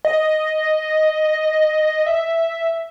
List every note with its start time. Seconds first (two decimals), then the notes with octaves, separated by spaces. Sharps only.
0.05 D#5
2.06 E5